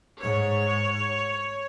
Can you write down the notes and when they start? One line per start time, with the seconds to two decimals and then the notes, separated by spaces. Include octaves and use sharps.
0.22 G#2 C#5